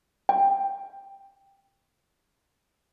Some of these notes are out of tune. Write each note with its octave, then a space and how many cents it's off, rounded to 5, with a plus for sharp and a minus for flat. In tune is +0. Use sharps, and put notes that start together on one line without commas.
G5 +5